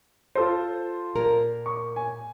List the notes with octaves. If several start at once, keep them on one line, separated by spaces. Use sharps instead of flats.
F4 A4 C5
A#2 A#4
C#6
G#5